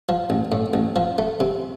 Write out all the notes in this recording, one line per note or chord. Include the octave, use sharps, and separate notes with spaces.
F3
A1
A2
A1
F3
A3
C3